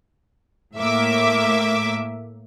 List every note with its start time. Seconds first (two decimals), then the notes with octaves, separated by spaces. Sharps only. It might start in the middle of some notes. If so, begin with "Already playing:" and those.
0.77 A2 A#3 E5 D6